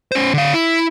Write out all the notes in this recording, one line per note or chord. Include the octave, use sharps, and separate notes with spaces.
C#4 C5
D3 F5
E4